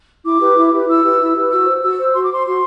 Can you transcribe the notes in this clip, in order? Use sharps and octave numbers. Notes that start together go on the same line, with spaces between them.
E4 D6
G4 B4
E4
G4 B4
E4 E6
G4 B4
E4
G4 B4
F#4 E6
C5
F#4 E6
C5
F#4 C6
D6
C5 C6
F#4 C6